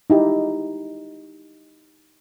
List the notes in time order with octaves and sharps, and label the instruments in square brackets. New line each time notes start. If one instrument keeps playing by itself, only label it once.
[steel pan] D#4 E4 G4